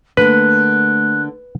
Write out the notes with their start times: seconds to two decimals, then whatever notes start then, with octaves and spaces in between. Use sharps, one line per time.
0.17 D3 A3 A#3 B4 F#6